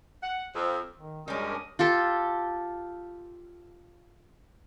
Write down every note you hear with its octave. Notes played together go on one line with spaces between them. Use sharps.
F#5
F2
D#3
F#2 G3 G#3 C#4 D4 A#4 D#6
F4 G4 A4